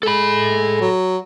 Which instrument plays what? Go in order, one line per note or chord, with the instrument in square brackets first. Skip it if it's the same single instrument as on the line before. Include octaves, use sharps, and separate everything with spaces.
[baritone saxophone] G#3 [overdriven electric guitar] A4 B5
[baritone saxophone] F#3